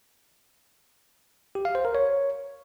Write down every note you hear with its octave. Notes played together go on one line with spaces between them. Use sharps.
G4
F5
C5
A#4
C#5